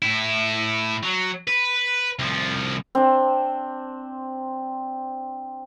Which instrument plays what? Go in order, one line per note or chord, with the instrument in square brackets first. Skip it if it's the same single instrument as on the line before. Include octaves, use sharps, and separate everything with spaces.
[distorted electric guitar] A2 E4
F#3
B4
C2 F3
[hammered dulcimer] C4 D4